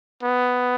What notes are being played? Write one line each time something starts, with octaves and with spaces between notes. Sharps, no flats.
B3